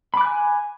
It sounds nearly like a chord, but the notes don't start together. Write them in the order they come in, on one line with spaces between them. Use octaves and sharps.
B5 D6 F#6 G#5